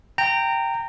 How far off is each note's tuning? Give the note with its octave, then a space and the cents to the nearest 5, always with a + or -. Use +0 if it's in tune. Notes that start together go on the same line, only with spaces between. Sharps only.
G5 +0 A#5 -20